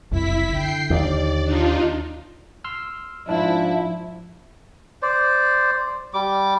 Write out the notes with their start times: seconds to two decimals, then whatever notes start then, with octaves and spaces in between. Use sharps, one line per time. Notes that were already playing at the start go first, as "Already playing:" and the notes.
0.11 F#1 C2 F#2 E4 B6
0.53 D3 G5 C7
0.90 D#2 D5
1.44 D4 D#4 F4
2.64 C6 E6 F6
3.29 G#2 F3 D4 E4
5.02 C5 D5
6.14 G3 D6